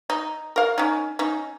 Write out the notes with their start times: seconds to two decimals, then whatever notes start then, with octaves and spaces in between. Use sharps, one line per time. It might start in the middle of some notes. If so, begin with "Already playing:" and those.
0.10 D#4
0.56 A#4 F5
0.78 C#4 D#4
1.19 C#4 D#4